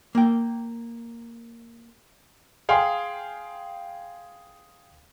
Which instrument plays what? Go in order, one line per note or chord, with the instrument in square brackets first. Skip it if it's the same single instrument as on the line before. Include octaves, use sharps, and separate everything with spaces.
[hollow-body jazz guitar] A#3 G5
[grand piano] G#4 F5 G5 G#5 C6